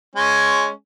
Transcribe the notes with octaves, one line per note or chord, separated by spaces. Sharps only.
G#3 C#4